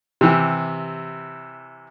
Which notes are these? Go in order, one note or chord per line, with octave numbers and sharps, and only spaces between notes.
C3 E3 G4